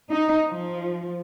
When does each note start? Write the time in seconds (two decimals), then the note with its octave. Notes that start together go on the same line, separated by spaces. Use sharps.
0.12 D#4
0.49 F3